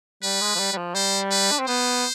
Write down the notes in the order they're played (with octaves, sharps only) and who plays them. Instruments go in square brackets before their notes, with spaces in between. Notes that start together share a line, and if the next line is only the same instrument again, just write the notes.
[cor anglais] G3 [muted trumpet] B4
[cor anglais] G#3
F3
G3
G3
F3
[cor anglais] G3 [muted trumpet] C5
[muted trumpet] B4
[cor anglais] D4
C4
[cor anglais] B3 [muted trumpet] C5